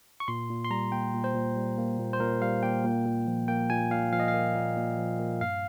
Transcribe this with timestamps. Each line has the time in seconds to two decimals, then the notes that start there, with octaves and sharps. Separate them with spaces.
0.20 C#6
0.28 A#2 C6
0.50 A#2
0.64 C6
0.70 G3 A#5
0.92 A#3 G5
1.14 A#2
1.24 C5
1.35 A#2
1.56 G3
1.78 A#3
1.99 A#2
2.13 C5
2.20 A#2 A#4
2.41 G3 F5
2.63 A#3 G5
2.84 A#2
3.06 A#2
3.27 F3
3.48 A#3 G5
3.70 A#2 G#5
3.91 A#2 F5
4.12 F3 F5
4.20 D#5
4.28 F5
4.34 A#3
4.55 A#2
4.77 A#2
4.98 F3
5.19 A#3
5.41 G2 F5